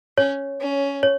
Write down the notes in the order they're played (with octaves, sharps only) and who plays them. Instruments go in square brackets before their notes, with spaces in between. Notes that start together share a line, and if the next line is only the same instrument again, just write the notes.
[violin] C#4 [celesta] C#5
[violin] C#4
[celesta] C#5